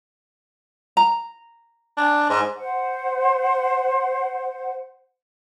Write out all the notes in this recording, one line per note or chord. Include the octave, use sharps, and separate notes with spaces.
A#5
D4
G#2
C5 F#5